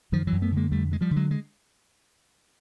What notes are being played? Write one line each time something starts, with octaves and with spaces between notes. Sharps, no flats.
F#2 D#3 F3
E3 F#3
F#2
A3 B3
D3 G#3 A#3
F2 G3 A3
D3 G#3
F3 G3
D3
F#3 G#3
G#3